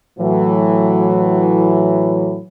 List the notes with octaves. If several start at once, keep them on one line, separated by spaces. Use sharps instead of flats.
A2 E3 F#3